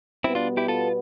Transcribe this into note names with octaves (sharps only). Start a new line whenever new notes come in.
B2 G3 B3 C4 E4
D4 F4
E4 G4
F4 A4